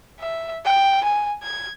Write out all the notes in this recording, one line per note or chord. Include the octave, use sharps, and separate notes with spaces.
E5
G5
G#5
G#6